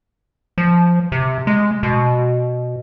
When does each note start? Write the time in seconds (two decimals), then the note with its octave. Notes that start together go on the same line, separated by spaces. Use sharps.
0.58 F3
1.12 C3
1.47 G#3
1.83 B2